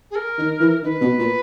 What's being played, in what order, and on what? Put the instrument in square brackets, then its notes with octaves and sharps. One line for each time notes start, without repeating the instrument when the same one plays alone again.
[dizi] G#4
A#4
[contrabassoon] D#3
E3
[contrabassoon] D#3 [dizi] B4
[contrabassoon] B2
A#2